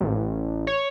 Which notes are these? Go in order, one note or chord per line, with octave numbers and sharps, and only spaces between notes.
A1
C#5